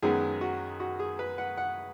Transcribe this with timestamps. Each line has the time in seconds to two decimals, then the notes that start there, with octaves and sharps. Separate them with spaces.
0.02 F#2 D#3 G#3 B3 G#4
0.41 F#4
0.80 F#4
0.99 G#4
1.19 B4
1.38 F#5
1.57 F#5